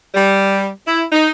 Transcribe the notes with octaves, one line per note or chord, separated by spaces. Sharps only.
G3
E4
D#4